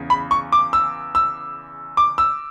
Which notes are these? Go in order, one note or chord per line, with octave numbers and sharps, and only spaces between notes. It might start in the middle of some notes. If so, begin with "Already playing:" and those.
Already playing: E2 C#3
B5
C#6
D6
E6
E6
D6
E6